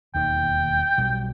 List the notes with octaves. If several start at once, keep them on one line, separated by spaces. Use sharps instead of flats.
E1 D#2 D#3 G5
B1 B2 G3